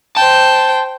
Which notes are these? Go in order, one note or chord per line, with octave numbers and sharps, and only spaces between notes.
C5 G5 A5